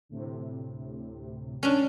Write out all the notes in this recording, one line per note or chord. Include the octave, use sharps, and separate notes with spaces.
D2 A2 C3
C#4 D4